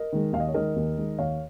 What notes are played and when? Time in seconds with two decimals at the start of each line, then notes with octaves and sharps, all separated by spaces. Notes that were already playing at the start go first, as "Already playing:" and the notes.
Already playing: A#4 D#5
0.12 D#3 G#3
0.33 D#2 F5
0.40 D#5
0.48 C#5
0.54 D#3 G#3 A#4 D#5
0.76 D#2
0.98 D#3 G#3
1.19 D#2 C#5 F5